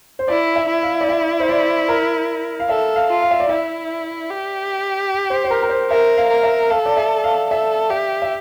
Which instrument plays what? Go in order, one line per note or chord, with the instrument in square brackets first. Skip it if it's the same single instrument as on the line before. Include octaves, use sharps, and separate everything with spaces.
[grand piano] C5
[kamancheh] E4 [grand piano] D5
[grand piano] E5
[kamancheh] E4
[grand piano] F5
D5
E5
C5
D5
A#4
F5
[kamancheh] A4 [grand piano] E5
[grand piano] F5
[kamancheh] F4
[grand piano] F5
E5
D5
[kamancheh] E4 [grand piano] E5
[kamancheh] G4
[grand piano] C5
C5
A#4
A#4
C5
[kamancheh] A#4 [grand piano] E5
[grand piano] F5
[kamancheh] A#4
[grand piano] E5
[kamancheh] A4 [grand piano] F5
[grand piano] D5
E5
F5
[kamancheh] A4 [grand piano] E5
[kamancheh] G4 [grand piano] E5
[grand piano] E5